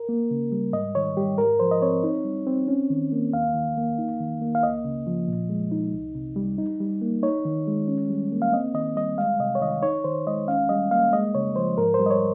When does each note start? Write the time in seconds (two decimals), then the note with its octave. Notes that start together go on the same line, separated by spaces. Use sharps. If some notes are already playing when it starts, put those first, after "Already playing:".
Already playing: A#4
0.09 A#3
0.31 C#3
0.52 G3
0.73 G#2 D#5
0.95 D#3 C#5
1.17 G3 G4
1.38 G#2 A#4
1.60 F3 C5
1.71 D#5
1.82 C4 C#5
2.04 D#4
2.25 G3
2.47 C4
2.68 C#4
2.90 D#3
3.12 A#3
3.33 D#2 F5
3.54 D#3
3.77 A#3
3.98 D#4
4.21 D#3
4.41 A#3
4.55 F5
4.63 C#2 D#5
4.85 C#3
5.07 F3
5.28 A#2
5.49 G#3
5.72 D#4
5.93 C2
6.15 C3
6.36 G3
6.58 D#4
6.80 G3
7.02 A#3
7.23 D#4 C#5
7.45 D#3
7.67 G#3
7.88 C#4
8.09 G3
8.32 A#3
8.42 F5
8.53 C4 D#5
8.74 D#3 D#5
8.96 G3 D#5
9.18 G#3 F5
9.39 C3 D#5
9.55 C#5
9.62 D#3 D#5
9.83 D#4 C#5
10.04 D#3 C5
10.27 G#3 D#5
10.48 C#4 F5
10.69 G3 D#5
10.91 A#3 F5
11.13 G#3 D#5
11.35 C#3 C#5
11.56 F3 C5
11.78 G#2 A#4
11.94 C5
12.00 G3
12.06 D#5
12.10 C#5